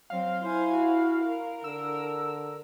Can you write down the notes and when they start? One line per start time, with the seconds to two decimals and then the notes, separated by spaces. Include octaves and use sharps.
0.10 F#3 C4 F5
0.43 E4 C5 G#5
0.73 F#4
1.24 A#4
1.64 D3 E6